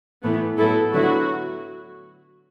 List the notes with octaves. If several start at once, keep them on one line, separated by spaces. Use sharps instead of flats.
A2 E3 A3 B3
A2 F#3 B3 E4 A4
D3 F#3 B3 E4 F#4